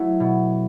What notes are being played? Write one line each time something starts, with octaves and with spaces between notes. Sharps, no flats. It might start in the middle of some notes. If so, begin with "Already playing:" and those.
Already playing: F#3 A3 E4 F#4
B2